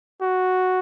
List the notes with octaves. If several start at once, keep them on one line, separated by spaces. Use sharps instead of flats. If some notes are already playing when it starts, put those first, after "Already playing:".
F#4